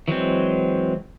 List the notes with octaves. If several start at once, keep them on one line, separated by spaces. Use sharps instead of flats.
E3 F#3 G#3 C4